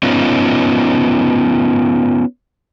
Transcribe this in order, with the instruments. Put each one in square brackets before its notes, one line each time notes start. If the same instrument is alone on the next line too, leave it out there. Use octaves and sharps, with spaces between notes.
[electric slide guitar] B3 C#4 D#4 F4